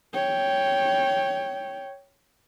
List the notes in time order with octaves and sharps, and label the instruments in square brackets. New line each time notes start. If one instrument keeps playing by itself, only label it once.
[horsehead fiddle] C#5 G5